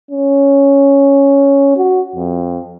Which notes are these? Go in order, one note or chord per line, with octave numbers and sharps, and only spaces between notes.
C#4
F#4
F2